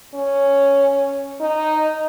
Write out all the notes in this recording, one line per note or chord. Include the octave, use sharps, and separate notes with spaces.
C#4
D#4